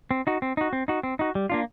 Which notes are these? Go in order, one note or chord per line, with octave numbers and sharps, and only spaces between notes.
C4
D#4 F#4
C4
D#4 F#4
C4
D#4 F#4
C4
D#4 F#4
G3
A#3 D4 F4